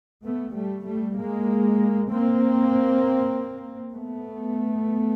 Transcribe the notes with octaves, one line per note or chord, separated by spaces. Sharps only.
A3 B3
G3 A3
G3 A3
G#3 A#3
A#3 C4
A3 B3